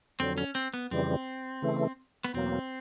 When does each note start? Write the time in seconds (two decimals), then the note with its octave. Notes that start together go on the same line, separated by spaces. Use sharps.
0.19 F2 D3 F#3 C4
0.38 C#4
0.55 C4
0.74 B3
0.91 F2 C#3 E3 G3 C4
1.62 C#3 E3 A3
2.24 B3
2.34 E2 B2 F#3 A#3 C4